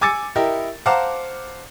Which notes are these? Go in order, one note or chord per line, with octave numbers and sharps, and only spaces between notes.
G#5 D6 E6 A6 C#7
E4 G4 A#4 D#5
C5 F5 F#5 A5 A#5 D6